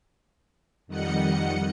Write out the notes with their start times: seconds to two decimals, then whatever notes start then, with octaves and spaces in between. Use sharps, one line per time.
0.87 F2 D#3 G3 D#5 F#5 C#7